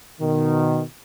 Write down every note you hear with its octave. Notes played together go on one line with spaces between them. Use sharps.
B2 D#3